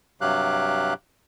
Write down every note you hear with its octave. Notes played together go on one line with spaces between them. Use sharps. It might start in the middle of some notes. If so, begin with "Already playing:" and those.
G2 C3 F#3 G4 F5 F#6